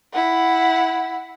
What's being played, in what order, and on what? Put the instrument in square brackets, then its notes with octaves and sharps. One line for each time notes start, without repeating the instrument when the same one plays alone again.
[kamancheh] E4 F#5